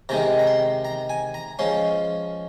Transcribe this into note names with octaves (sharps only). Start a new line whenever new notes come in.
C3 D#3 G#3 D#4 A#5
A#5
C6
A#5
G#5
A#5
F3 G#3 C#4 C6